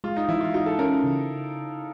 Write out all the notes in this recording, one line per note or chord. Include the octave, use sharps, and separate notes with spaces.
G#3 F4
D#4
E3 E4
F4
D#4 F#4
A4
C#4 A#4
C#3